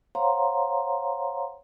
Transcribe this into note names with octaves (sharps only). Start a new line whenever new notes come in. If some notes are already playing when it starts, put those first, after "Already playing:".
C5 C#5 F5 F#5 A#5 C6